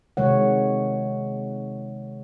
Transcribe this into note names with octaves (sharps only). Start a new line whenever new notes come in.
C3 D#3 G#3 C#5 F#5